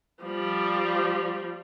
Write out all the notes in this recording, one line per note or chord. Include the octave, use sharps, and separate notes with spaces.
F3 G3